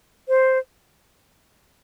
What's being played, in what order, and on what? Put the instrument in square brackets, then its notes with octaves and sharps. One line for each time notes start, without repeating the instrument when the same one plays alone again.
[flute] C5